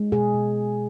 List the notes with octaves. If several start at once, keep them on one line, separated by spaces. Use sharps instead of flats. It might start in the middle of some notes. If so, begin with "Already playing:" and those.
Already playing: G#3
B2 G#4
B2